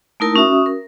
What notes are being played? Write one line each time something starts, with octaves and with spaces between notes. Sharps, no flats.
A3 A#3 D#4 E4 A#4 A5
C#4 F#4 E5 D#6
A#4